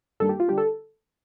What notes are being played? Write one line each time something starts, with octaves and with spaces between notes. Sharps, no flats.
G2 D#3 G3 A#3 D4 A4
G4
F4
D3 G3 D4 G4
A4